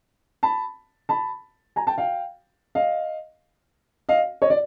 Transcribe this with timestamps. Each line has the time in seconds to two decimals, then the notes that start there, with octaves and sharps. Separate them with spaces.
0.43 A5 B5
1.09 A5 B5
1.76 G#5 A#5
1.87 G5 A5
1.98 F5 G5
2.75 D#5 F5
4.09 D#5 F5
4.42 C#5 D#5
4.50 D5